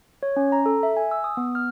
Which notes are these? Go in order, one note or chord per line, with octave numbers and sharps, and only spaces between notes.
C#5
C#4
A#5
A4
E5
G#5
E6
D#6
B3
F6